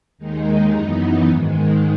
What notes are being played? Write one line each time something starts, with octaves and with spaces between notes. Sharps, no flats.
D#2 D#3 G#3 D#4
F#2 E3 B3 D#4
G#2 D#3 G#3